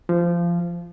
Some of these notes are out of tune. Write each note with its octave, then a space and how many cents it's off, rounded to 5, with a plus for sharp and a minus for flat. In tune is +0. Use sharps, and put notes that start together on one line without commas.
F3 -20